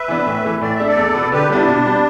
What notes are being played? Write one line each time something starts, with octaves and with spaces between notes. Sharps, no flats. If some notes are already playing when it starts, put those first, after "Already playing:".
Already playing: B4 E5
E3 B3 D4
A2
E3 A3
A2 D5
E5
A3 D4
A4 D5
E2
B2 B3
D3 G4 B4
G3 B3 D4 E4
B2
G3 B3